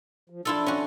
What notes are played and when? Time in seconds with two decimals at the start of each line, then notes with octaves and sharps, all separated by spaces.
0.30 F3
0.45 D4 E4 F4 A4
0.66 C#4 F#4